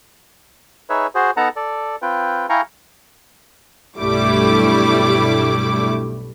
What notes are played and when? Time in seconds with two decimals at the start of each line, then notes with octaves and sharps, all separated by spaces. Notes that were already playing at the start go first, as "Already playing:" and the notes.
0.90 D#4 G#4 B4 C#5 E5
1.15 F#4 G#4 C5
1.37 B3 D#4 A4 F#5 A5 A#5
1.56 A4 D5
2.02 C4 F4 B4 G5
2.49 E4 F5 G5 G#5 A#5 C#6
3.99 B1 G2 G3 A3 E4 D6